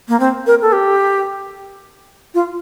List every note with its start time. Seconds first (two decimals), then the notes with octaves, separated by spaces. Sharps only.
0.08 A#3
0.20 C4
0.47 A#4
0.62 A4
0.72 G4
2.34 F4